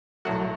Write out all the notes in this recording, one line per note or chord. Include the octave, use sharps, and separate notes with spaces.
B1 A2 F#3 A3 F#4 F#5